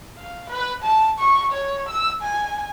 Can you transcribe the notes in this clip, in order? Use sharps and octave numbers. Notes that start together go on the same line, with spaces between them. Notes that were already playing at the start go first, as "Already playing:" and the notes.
F5
B4
A5
C#6
C#5
E6
G#5